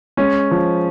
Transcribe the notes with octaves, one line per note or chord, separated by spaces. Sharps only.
G#3 C#4
F3